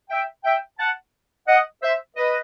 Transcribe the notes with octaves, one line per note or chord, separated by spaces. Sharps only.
E5 G5
E5 G5
F#5 A5
D#5 F#5
C5 E5
B4 D#5